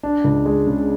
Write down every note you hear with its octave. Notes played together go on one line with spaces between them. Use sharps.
D4
C#2
G#3
C#3